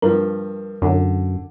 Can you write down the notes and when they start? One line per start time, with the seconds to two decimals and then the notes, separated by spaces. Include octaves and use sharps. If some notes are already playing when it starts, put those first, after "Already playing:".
0.02 G2 F3 A#4
0.82 F#2 D3